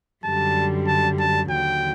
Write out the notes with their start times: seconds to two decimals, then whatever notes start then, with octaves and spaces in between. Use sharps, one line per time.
0.24 F#2 D3 G3 A5
0.87 A5
1.19 A5
1.50 D#2 D3 F#3 G5